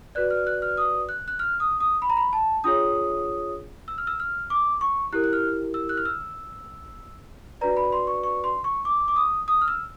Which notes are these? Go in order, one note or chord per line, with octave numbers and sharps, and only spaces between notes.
F#4 B4 D5 F#6
F6
F#6
F6
D#6
F#6
F#6
F6
D#6
D#6
B5
A#5
B5
A5
D4 F4 G#4 C#5 D#6
E6
F6
E6
F6
D6
C#6
E4 G4 A#4 F#6
F#6
F6
E6
F#6
F6
E6
D4 F#4 B4 D5 A#5
B5
C6
C#6
C#6
C6
C#6
D6
D6
D#6
D#6
F6
E6